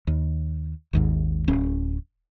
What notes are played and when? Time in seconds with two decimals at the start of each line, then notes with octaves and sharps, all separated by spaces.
0.07 D#2
0.93 G#1 D#2 G#2
1.48 D1 C#4